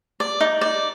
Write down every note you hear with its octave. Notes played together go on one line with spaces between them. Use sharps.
D5
D#4
D5